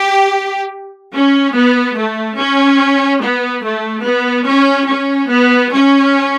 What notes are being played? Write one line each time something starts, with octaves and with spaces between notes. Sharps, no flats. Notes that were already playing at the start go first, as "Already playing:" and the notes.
Already playing: G4
C#4
B3
A3
C#4
B3
A3
B3
C#4
C#4
B3
C#4